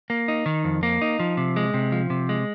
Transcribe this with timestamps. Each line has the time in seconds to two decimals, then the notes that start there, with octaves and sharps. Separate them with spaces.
0.10 A#3
0.28 D#4
0.46 D#3
0.64 F2
0.83 A#3
1.02 D#4
1.20 F3
1.37 C3
1.56 G#3
1.74 C3
1.92 F3
2.10 C3
2.29 G#3